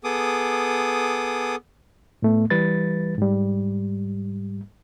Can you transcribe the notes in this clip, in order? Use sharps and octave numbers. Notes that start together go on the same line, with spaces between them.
B3 G#4 A4 D6 D#6
A2 A3 B3
E3 G3 B4 A6
G#2 G3